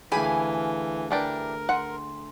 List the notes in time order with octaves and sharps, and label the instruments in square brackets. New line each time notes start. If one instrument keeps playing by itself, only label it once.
[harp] D2 G#4 [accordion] E3 [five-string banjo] G4 [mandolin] F5 G#5 B5
[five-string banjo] E3 D4 G4 [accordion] A#4
[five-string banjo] F#5 [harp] C6